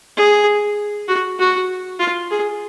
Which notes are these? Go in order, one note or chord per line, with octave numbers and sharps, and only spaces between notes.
G#4
F#4
F#4
F4
G#4